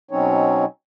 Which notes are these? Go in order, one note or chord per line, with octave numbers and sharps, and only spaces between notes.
B2 F#3 C4 C#4 D#4 C#5